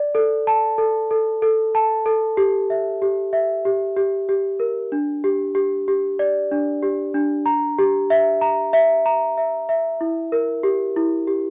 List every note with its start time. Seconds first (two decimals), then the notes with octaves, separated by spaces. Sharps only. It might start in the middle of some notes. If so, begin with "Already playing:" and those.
Already playing: D5
0.15 A4
0.47 A5
0.78 A4
1.11 A4
1.42 A4
1.75 A5
2.06 A4
2.37 G4
2.70 E5
3.02 G4
3.33 E5
3.65 G4
3.97 G4
4.29 G4
4.60 A#4
4.92 D4
5.24 G4
5.55 G4
5.88 G4
6.19 D5
6.51 D4
6.83 G4
7.14 D4
7.46 A#5
7.79 G4
8.10 E5
8.41 A#5
8.73 E5
9.06 A#5
9.37 E5
9.69 E5
10.01 E4
10.32 A#4
10.63 G4
10.96 E4
11.27 G4